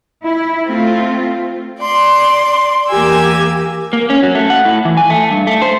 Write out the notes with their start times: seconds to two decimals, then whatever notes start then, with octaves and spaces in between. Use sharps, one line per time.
0.24 E4
0.67 A3 C4 F4
1.79 D5 C6
2.88 E2 A#3 G4 G#5 E6
3.93 A#3
4.10 C#4
4.23 F#3
4.35 A3
4.50 F#5
4.65 A2
4.85 E3
4.97 G#5
5.10 A3
5.31 G2
5.47 A3
5.62 C5